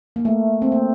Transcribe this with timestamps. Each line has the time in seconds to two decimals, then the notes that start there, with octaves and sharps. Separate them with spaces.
0.16 A#3
0.25 A3
0.62 C4
0.72 A#3